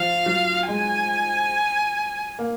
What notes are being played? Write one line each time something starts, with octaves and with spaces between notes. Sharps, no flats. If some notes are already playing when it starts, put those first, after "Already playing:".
Already playing: F3 F5
F#3
G#3 G#5
A#3